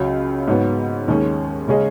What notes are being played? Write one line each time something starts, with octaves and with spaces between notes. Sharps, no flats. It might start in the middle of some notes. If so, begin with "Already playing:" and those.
Already playing: C#2 C#3 F#3
G#2 F#3 B3
D#2 D#3 G#3 C#4 G#4
C#3 G#3 C#4 G#4 D#5